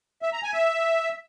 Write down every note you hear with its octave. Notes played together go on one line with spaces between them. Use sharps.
E5
A#5
G#5
E5